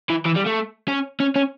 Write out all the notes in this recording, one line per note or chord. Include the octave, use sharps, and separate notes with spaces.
E3
E3
G3
A3
C#4
C#4
C#4